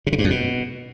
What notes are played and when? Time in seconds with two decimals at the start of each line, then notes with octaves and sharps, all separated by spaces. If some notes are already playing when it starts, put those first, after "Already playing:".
0.07 C3
0.13 C#3
0.18 G2
0.24 F2
0.30 B2